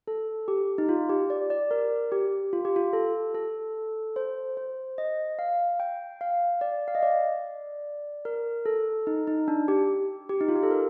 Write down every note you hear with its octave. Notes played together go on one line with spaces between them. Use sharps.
A4
G4
D#4
F4
G4
D5
D5
A#4
G4
F4
G4
F4
A4
A4
C5
C5
D#5
F5
G5
F5
D5
F5
D#5
D5
A#4
A4
D#4
D#4
D4
G4
G4
D#4
F4
G4
A4
A#4